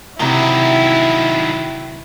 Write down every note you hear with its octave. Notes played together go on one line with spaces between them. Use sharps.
C3 D#3 F#3 E4 A#5